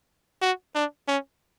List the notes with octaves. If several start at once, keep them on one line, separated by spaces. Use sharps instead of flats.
F#4
D4
C#4